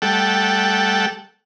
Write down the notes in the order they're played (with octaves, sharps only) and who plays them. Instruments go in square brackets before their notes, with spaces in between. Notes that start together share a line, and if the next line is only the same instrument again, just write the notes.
[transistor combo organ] G3 A3 A4 F#5 G5